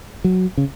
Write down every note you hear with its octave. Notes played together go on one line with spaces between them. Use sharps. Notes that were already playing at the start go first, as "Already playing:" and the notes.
F#3
C#3